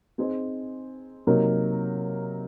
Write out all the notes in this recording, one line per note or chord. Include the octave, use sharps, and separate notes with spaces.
C4 D#4 G#4 C5 D#5
C3 F#3 A#3 D#4 A#4